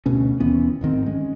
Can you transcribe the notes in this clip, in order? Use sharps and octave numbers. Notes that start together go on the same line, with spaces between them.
D2 B2 C#4
D#2 E3 B3 C#4
A1 G#2 D#3 C4
G#3 C#4